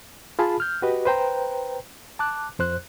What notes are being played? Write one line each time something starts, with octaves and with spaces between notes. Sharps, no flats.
F4 G#4 A5 B5
F6 G6
F#4 G4 B4 D#5
B4 C5 G5 A#5
A5 D6 F#6
F2 C5 F#6